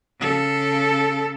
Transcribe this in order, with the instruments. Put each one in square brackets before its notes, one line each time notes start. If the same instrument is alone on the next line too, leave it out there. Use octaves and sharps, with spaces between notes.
[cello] C#3 A4